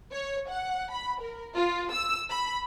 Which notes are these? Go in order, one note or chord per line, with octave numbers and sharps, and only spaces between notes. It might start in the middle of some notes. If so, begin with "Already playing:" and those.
C#5
F#5
B5
A#4
F4
E6
B5